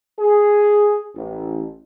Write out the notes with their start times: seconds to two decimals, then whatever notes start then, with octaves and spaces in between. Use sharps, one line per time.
0.19 G#4
1.16 A1